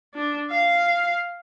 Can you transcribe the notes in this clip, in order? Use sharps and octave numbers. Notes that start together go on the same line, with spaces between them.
D4
F5